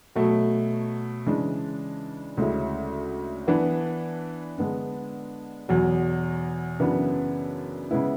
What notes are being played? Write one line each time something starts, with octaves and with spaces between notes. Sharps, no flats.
B2 F#3 A3
C#3 E3 G#3 D4
D2 C#3 G#3 C#4 E4
E3 B3 D4
D3 G#3 B3 D4
E2 B2 F#3
F#2 C#3 E3 B3 D4
C#3 G#3 B3 E4